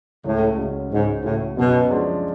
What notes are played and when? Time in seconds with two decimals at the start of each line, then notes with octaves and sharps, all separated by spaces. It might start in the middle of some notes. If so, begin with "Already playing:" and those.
0.24 C#2 A2
0.58 C#3 G#3 C#4 F#4
0.91 C#2 G#2
1.24 A2 C#3 G#3 C#4 F#4
1.57 F#2 B2
1.90 F3 G#3 D4 F4